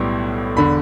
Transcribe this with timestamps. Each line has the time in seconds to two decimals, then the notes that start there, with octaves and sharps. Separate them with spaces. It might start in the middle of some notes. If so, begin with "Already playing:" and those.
Already playing: B1 A2 G3 B3
0.56 E1 D3 B5